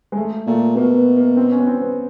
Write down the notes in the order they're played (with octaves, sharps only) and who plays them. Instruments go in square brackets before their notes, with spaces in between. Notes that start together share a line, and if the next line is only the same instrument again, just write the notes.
[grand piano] G#3
A3
[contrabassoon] A#2 [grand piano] A3
[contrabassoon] B2 [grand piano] A#3
[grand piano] B3
A#3
C4
C#4
B3
C4
B3